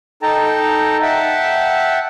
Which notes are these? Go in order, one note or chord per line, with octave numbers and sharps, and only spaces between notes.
D#4 A4 G5 A5 A#5
E5 F#5 G5 A5